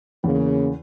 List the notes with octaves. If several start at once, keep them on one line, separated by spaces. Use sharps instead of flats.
E2 C#3 A#3